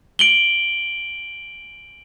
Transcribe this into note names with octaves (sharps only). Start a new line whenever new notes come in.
D7 F#7 G7